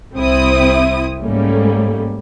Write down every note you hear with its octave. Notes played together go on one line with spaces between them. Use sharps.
C2 C4 E4 D#6
G#2 G3 A3 A#3 C#4